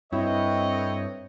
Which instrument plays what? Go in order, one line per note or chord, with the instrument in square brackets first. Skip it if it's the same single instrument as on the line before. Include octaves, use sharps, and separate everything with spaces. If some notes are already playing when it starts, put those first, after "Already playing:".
[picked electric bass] G2 [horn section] C4 C#5 [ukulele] E4 [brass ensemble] A4 B4 D#5